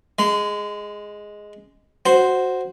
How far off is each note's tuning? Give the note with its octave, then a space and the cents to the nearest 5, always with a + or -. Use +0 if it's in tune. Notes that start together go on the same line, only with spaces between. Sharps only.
G#3 +0 C6 -40
F#4 +0 C5 +0